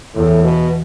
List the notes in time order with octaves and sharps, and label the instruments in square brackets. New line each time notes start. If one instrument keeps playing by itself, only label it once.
[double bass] E2 [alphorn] A2
[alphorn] B2